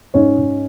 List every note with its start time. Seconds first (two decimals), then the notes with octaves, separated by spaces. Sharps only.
0.14 G#2 C#4 C#5
0.38 G#2